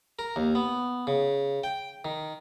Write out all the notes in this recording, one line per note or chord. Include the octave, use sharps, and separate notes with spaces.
A#4
D#2
B3
C#3
G5
D#3